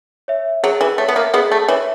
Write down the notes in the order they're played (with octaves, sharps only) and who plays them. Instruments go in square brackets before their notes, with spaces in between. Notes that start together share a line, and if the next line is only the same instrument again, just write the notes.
[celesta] C#5 E5
[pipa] F#3 [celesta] G#4
[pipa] E3
[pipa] A3 [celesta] C#5 E5
[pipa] B3
A#3
[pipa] B2 B3 [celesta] G#4
[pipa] A3
[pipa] E3 [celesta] C#5 E5